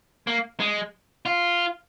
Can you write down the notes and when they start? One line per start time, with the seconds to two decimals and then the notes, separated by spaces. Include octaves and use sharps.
0.27 A#3
0.60 G#3
1.26 F4